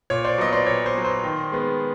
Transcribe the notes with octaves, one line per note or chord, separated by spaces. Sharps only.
A#2 C#5
C5 D5
F#3 B3 D#5
C5 D5
A#2 C#5
C5
F#3 B3
C5
D#3
G#3 B3